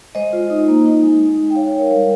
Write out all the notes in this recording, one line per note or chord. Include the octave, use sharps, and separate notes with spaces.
G#3 C5 D#5
F4
D#4
A#3
D#4
G#3
D#4
G#3
G5
D#4 C#5 F5
C#5 F5
G#3
A#4 C#5
G3 A#4 C#5